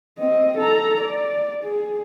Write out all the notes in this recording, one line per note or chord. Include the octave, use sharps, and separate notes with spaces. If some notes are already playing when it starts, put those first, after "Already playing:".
C4 D#5
A4 A#5
D5
G#4